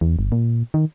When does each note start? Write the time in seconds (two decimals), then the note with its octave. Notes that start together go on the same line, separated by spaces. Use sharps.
0.01 E2
0.19 G1
0.32 A#2
0.74 D#3